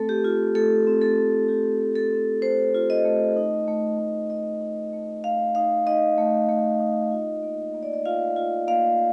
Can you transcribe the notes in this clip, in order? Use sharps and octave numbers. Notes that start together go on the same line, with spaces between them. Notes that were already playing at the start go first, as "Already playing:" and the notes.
Already playing: A3 C4 A4
G4
F4
A3 A4
C4
A4
A3
F4 G4
A3
A4
C4
A3 C5
F4
D#5
A3
D#4
A3
A3
D#4 D#5
D#4
A3
A3 F5
D#4 F5
D#4 D#5
A3
A3
D#4
F4
A#3
A#3
D5
D#5
F4 F5
F4
A#3 F5